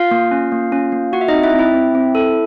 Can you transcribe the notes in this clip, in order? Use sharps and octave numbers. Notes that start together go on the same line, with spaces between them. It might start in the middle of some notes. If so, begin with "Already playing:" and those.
Already playing: F4 F5
A#3
C#4
A#3
C#4
A#3
F4 F#4 F#5
E5
C4 D#4 D#5
E4 E5
C4
E4 E5
C4
C4
A4